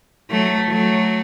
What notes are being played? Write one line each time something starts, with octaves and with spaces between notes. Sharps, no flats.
F#3 A3
F#3 A3